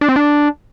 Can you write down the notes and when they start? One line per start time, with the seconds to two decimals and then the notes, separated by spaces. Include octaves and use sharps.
0.01 D4
0.09 C4
0.16 D4